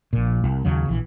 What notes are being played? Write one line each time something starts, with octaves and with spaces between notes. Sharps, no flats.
A#1 A#2
C2
D#2 C#3 F#3
A#1 E3